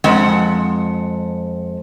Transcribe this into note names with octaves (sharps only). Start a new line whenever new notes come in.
F2 G#3 F#5